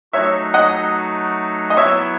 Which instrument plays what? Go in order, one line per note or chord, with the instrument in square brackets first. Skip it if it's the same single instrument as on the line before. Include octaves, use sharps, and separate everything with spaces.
[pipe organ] F#3 A3 D#4 F#4 [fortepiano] C#5 E5
[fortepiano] D#5 F#5
D#5
[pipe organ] F#3 B3 E4 [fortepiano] C#5 E5